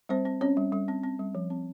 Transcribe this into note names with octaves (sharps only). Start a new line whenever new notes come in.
G3 C4 C5
C4
C4 C#4 C#5
G3
G3
C4
C4
G3
F3
C4